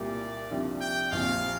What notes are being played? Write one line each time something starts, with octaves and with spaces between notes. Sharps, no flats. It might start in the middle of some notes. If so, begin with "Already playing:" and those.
Already playing: C2 A#2 A#3 G4 D5
C2 C3 F3 D4 G4
G5
A#1 A#2 F3 C4 F5